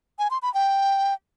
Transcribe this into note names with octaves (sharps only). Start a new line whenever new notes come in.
G#5
C6
B5
G5